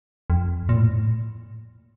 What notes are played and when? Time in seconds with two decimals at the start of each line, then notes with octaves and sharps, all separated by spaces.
0.30 F2
0.69 A#2
0.77 A2